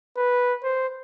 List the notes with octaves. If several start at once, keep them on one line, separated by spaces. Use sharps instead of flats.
B4
C5